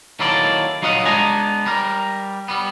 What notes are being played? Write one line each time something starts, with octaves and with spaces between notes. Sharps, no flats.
D#3 F#3 A#3 E4 A4 D5
F#3 D#4 F4 D#5 F5 F#5
G#3 B3 D4 G#5 A#5
G3 A#4
G3 B3